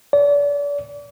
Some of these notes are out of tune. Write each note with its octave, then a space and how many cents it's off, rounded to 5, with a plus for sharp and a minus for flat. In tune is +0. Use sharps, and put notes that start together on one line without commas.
D5 -35